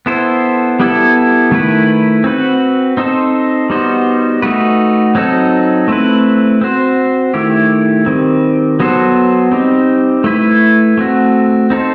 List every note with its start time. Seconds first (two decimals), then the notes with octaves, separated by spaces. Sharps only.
0.06 B3 E4 A4 C5
0.80 G3 B3 E4 A4
1.51 D#3 A3 E4 B4
2.24 C4 F#4 B4
2.97 C4 D#4 A4 C5
3.70 G3 B3 D#4 F#4 C5
4.42 A3 D#4 F#4 B4
5.15 F#3 C4 D#4 A4
5.88 A3 C4 E4 B4
6.61 C4 F#4 C5
7.34 D#3 A3 E4 G4
8.06 D#3 G3 C4
8.80 F#3 B3 F#4 A4 C5
9.52 G3 C4 D#4
10.24 A3 E4 B4
10.98 A3 C4 F#4
11.70 C4 D#4 A4 C5